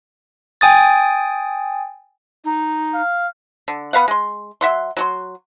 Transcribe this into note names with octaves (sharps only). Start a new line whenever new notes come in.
G5 G#5 D#6 A6
D#4
F5
D3
B3 B4 F5 F#5
G#3 C6
F#3 E5 F#5 C6
F#3 F#4 C6